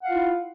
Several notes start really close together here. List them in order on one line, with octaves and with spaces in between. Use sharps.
F#5 F5 F4 E4